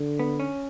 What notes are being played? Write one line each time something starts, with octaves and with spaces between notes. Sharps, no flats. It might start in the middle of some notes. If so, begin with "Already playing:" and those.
Already playing: D3
B3
C#4